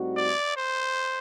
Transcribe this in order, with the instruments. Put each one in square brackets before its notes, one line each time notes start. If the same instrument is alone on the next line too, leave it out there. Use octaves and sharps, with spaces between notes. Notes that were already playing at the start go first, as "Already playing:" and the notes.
Already playing: [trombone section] A2 G3 C4 D#4 F#4
[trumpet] D5
C5